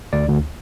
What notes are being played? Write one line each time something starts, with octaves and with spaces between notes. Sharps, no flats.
D2 D5
D2